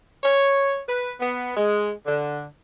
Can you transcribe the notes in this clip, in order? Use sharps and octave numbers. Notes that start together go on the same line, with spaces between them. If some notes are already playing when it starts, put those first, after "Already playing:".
C#5
B4
B3
G#3
D3